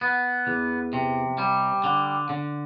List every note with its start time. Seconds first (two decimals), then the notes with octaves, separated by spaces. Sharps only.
0.01 B3
0.47 E2
0.93 C3
1.38 G3
1.84 D3
2.29 D3